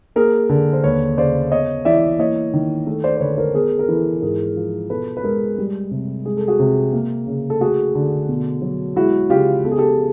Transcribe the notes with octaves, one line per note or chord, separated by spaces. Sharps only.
A#3 G#4 A#4
D3
C5
D#2 B4 C#5
C#3 C5 D5
B3 C#5 D#5
E3 D5 E5
A#3 C#5 D#5
D#3
A3
C5 D5
C5
D3 B4 C#5
B4
A#4 C5
B3 G#4 A#4
A#4
E3 A4 B4
G#2 G#4 A#4
F3
B2 A4 B4
B4
G#3 G#4 A#4
G3
C3
G#3 G#4
A4
F#4 G#4
C3
A#3
C#3
A4
A3 F#4 G#4
D3
B2
F#3
G#3 E4 F#4
C#3 F4 G4
B3 A4
G#4
G4 A4